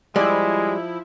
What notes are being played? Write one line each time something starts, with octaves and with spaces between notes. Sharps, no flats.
F3 G3 G#3 E4